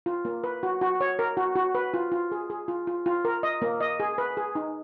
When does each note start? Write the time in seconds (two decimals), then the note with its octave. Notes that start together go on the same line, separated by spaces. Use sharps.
0.06 F4
0.25 A#3
0.44 B4
0.63 F#4
0.81 F#4
1.01 C#5
1.19 A#4
1.37 F#4
1.56 F#4
1.75 B4
1.94 F4
2.12 F4
2.32 G#4
2.50 G#4
2.68 F4
2.87 F4
3.06 F4
3.25 A#4
3.43 D#5
3.62 A#3
3.80 D#5
4.00 G#4
4.18 B4
4.37 G#4
4.55 D#4